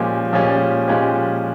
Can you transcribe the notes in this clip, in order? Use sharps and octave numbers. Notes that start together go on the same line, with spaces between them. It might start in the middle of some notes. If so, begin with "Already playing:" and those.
Already playing: A#2 F3 G#3 C#4 G4
A#2 F3 G#3 C#4 G4
A#2 F3 G#3 C#4 G4